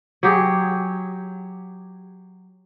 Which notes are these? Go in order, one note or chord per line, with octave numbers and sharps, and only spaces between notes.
F#3 G4 G#4